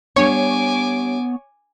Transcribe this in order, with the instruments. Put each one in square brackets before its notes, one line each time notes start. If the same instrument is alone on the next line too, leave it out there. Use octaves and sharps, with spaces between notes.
[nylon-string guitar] G3 D4 [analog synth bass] B3 [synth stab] C#5 [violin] G#5 D6